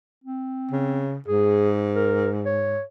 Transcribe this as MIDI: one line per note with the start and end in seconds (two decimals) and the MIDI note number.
0.24 1.05 60
0.71 1.18 49
1.28 2.80 44
1.28 1.70 68
1.96 2.30 70
2.46 2.82 73